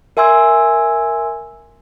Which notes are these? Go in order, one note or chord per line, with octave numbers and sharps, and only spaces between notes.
A#4 E5 G#5 C6 E6 G#6